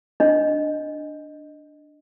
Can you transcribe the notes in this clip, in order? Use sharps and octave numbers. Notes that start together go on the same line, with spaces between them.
D4 D#5